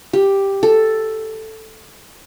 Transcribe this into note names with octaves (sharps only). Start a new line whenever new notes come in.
G4
A4